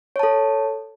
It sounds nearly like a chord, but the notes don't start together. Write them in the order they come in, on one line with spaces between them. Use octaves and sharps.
C#5 A5 A4